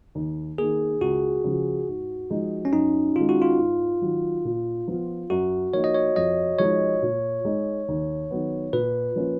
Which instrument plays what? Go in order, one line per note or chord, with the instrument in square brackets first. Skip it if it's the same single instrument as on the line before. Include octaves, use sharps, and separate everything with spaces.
[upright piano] D#2
[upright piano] D#3 A#3 [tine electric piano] G#4
[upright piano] C#2 [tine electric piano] F#4
[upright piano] C#3 F3
G#2
F3 G#3 D#4
[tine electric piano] C#4
[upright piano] F#2 [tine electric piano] D#4
[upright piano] D#3 G#3 [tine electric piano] F4
[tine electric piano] F#4
F4
[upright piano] G#2
D#3 F#3
A#2
F3 B3 F4
[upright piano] F#2 [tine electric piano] F#4
[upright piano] F3 A#3 D#4 [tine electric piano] C#5
[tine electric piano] D#5
C#5
[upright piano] F2 [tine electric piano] D#5
[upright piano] F3 G#3 D#4 [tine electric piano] C#5
[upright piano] A#2
G#3 D#4
D#2
D#3 F#3 B3
[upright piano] A#2 [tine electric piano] B4
[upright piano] F3 A#3 C#4 F4